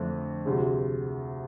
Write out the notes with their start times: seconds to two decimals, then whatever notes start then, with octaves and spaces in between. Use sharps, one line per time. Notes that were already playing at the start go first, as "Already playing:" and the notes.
Already playing: F2 D3 A3 D4
0.45 D2 C3 G#3